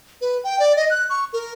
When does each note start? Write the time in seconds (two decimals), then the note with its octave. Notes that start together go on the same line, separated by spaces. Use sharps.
0.21 B4
0.44 G5
0.60 D5
0.76 D#5
0.90 F#6
1.10 C#6
1.33 A#4